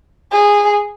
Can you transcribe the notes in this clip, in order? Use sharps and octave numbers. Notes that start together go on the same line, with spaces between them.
G#4